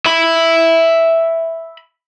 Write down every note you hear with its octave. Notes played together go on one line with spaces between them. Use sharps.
E5 B5